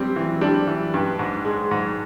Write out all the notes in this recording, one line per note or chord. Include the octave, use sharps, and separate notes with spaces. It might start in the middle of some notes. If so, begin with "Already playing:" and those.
Already playing: G2 G3 C4
E3
G3 D4
E3
G2
G#2
G#3
G#2